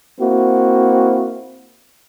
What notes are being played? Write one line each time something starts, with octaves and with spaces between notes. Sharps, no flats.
A#3 C4 E4 F#4